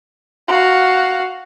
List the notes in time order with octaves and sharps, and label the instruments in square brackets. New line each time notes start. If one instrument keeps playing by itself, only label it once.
[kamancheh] F#4 F5